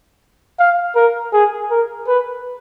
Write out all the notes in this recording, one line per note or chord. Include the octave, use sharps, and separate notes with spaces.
F5
A#4
G#4
A#4
B4